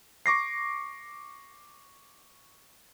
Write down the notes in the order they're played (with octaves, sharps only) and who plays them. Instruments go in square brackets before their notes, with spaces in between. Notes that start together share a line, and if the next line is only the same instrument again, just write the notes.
[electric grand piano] C#6 D6 A#6 C7